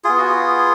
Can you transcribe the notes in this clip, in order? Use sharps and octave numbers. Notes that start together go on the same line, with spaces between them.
B3 F4 G#4
F#4
G#4